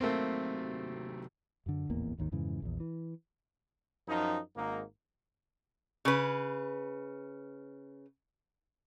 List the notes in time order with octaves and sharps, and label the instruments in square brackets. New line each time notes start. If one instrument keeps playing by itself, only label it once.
[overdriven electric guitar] C3 F#3 [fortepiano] A3 A#3 C4
[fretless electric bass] F#2 D3
D#1 A1 E2 A#3
G#1 D#2 D#3
F2 G#2 C#3 E3
A#1 E2
E3
[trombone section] F#2 F3 D#4
G#1 G#2 A#3 D#4
[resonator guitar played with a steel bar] C#3 B4